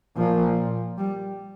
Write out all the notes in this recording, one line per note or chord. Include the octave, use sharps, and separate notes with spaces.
A#2 F3
G3